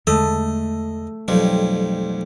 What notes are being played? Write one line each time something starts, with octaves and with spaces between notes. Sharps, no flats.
E2 D3 G#3 A3 D#5
B1 F2 F#3 G3